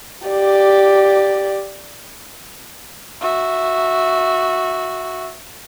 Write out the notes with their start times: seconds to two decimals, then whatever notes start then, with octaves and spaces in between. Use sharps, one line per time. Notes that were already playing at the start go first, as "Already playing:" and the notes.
0.28 G4 D5
3.21 F#4 E5